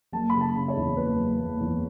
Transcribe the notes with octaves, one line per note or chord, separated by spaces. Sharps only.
F#1 A5
C#3 B5
A5
C#3
C#5
E2
F#1 B4
F#1
F#1
E2